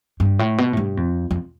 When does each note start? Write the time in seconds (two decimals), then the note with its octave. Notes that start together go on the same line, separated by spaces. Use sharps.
0.20 G2
0.39 A2
0.58 B2
0.73 A2
0.77 G2
0.97 F2
1.31 F2